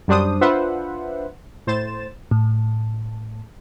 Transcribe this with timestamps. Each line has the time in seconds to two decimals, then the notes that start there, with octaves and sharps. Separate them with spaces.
0.08 F#2 G3 D4 C5 D#6
0.41 D4 F4 B4 C5 E5 F#5
1.67 A2 C5 A6 E7
2.31 A2